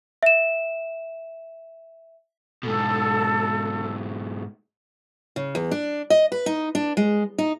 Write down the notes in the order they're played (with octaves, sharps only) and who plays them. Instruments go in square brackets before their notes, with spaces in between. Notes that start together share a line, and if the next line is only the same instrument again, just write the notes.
[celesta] E5 E7
[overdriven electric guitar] G#2 B2 [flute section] A4
[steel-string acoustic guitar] C#3
E2
D4
D#5
B4
D#4
D4
G#3
D#4